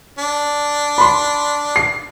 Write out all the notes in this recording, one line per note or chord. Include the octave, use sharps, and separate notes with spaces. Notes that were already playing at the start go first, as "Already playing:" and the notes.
D4
B5 C6
C7